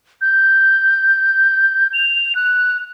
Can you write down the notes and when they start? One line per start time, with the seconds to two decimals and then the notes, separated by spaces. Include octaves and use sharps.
0.21 G6
1.93 F7
2.35 F#6